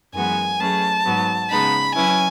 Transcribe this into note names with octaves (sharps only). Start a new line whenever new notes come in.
F#2 E3 G#3 B3 F#4 G#5
F#3 A3 C#4 G#4 B4 A5
G#2 F#3 B3
C#3 G#3 B3 D#4 B5
F#3 C#4 E4 B4 G#5